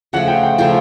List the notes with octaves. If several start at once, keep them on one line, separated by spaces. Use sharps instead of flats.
C#3 F3 A3 F#5
G5
G5
C#3 F3 A3 G5